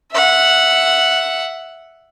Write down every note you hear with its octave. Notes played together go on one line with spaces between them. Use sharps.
E5 F#5